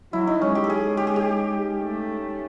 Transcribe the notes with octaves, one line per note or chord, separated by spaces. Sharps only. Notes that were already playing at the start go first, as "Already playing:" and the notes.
F#3 E4
D#4
G#3 C#4
G4
A4
G#4
G4
G#4
G4
A3